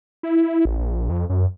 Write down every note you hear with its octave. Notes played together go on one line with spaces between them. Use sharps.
E4
A1
A#1
F2
F#2